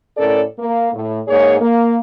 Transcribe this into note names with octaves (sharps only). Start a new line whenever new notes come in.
A2 C#4 A4 A#4 D5
A#3
A2
G#2 A#3 G#4 C#5
A#3